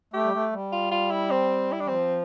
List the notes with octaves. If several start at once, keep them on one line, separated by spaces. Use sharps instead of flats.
A3 G4
G3
A3
G3
F4
F4
E4
C4
E4
D4
E3
F3 C4